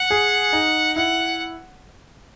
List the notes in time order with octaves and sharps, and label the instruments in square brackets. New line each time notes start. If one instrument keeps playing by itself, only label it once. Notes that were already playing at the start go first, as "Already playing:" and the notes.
Already playing: [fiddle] F#5
[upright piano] G#4
D#4
[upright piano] E4 [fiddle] F#5